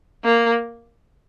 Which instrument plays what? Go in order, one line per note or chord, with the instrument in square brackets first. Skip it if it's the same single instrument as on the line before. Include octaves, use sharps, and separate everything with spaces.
[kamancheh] A#3